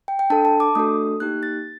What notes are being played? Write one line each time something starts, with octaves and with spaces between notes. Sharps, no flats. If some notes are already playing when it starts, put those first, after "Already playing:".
G5
G5
D4 A4 A5
A5
D6
A3 D4 F#4 A4 D#6
A#3 D#4 G4 F#6
A6